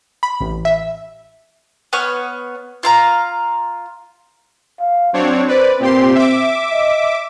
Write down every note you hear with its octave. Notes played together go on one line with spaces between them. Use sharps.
B5
A1
E5
B3 C#5 C#6 F6
F4 F5 A#5
F5
F#3 C4 D4 C#5
B4 C5 D5
A#2 C4 G4 C6
E5 D6
D#5